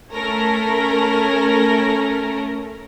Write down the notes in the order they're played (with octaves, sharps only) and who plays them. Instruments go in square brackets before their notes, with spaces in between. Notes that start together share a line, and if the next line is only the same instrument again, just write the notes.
[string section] A3 C#4 A4 A#4